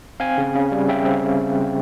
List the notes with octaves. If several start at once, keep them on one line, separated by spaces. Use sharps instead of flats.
C4 F5 G#5
C#3
C#3
G3
C#3 E5 G5
C4